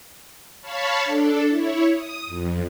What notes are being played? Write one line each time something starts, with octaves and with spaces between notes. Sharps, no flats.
C#5 F5 A5 B5 C#6
D4 A4
E4 C#5
D#6
F2